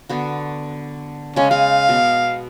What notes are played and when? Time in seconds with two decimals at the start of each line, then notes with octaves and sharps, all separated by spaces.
0.09 D3 B3 F#4
1.36 C#3 G#3 C#4
1.51 G#3 F5
1.89 B2